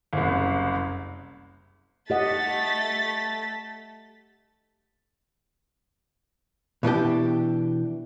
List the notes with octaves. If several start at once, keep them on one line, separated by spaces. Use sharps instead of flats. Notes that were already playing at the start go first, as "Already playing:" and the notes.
F#1 C2
A3 G4 D#5 F#5 A6 B6
B2 E3 D4 G4